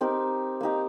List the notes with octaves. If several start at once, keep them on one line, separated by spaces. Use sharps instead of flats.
C4 D#4 G4 A#4
A#3 D#4 G4